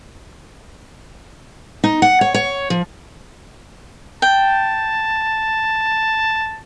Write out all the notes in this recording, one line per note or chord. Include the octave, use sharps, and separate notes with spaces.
D#4
F#5
C#5
C#5
F3
G5 A5